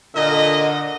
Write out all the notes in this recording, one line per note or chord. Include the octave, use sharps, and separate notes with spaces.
A#2 D3 D#5